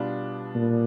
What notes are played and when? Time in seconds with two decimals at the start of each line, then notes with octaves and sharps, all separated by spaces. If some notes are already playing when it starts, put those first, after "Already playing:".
Already playing: B2 G3 B3 D4 F4
0.55 A#2